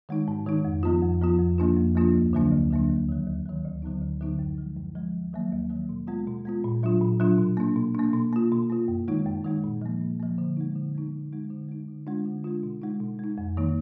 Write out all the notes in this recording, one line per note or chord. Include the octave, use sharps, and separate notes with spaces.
D#3 G#3 D#4
G#2
D#3 G#3 D#4
F2
F3 B3 F4
F2
F3 B3 F4
F2
F3 A#3 D4 F4
F2
F3 A#3 D4 F4
D2
D3 F#3 A#3 D4
D2
D3 F#3 A#3 D4
D#2
D#3 F#3
D#2
D#3 F#3
D2
D3 F#3 B3 D#4
D2
D3 F#3 B3 D#4
F#2
F3 G#3
F#2
F3 G#3
D#2
D#3 F#3 A#3
D#2
D#3 F#3 A#3
B2
G#3 B3 F4
B2
G#3 B3 F4
A#2
F#3 D4 F4
A#2
F#3 D4 F4
B2
A#3 D4
B2
A#3 D4
B2
A#3 F4
B2
A#3 F4
F#2
D#3 G#3 D#4
F#2
D#3 G#3 D#4
A#2
F3 A#3
A#2
F3 A#3
D3
G#3 B3 D#4
D3
G#3 B3 D#4
D3
G#3 D#4
D3
G#3 D#4
D3
G#3 D4 F4
D3
G#3 D4 F4
B2
G#3 D#4
B2
G#3 D#4
F2
D#3 A#3 D#4